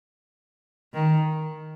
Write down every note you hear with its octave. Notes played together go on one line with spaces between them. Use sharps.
D#3